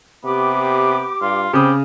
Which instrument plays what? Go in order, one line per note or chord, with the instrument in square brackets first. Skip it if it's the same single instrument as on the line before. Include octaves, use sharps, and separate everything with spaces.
[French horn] C3 [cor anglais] B3 [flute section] G4 D6
[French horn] G2 [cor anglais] F4
[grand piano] C#3 D#6 [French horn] C4 [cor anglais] G4 [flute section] B5